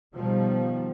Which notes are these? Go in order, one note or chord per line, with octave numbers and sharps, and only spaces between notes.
B2 D#3 F3 G3